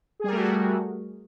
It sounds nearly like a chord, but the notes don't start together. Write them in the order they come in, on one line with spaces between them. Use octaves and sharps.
G#4 G3 A#4 A3 F#4